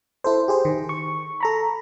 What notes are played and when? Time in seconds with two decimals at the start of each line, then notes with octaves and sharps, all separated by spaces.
0.24 E4 A4 C5
0.48 G4 G#4 C5
0.65 D#3
0.89 C#6
1.40 A4 A#5 B5